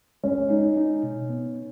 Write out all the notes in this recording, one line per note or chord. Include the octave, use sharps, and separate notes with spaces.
G#3 C#4
D#4
D#4
B2
B3